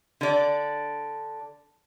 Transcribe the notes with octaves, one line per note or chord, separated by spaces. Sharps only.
D3 D5